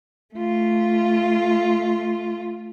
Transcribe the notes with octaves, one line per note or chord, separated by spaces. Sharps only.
A3 F4